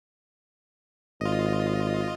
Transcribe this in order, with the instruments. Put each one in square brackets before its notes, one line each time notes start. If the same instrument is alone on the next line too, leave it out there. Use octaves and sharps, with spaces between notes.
[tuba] G#1 [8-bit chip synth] F4 D#5